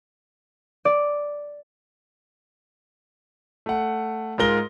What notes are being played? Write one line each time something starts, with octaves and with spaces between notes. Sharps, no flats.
D5
A3 F#5
G#2 G#3 F4 A#4 A#6 G7